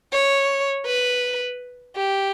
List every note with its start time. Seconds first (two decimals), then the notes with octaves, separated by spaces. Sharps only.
0.12 C#5
0.86 B4
1.96 G4